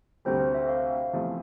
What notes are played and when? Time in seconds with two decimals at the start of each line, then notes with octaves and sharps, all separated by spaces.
0.25 D2 C3 G3 C5
0.40 C5
0.54 E5
0.69 F5
1.13 E2 C3 F3 A3 E4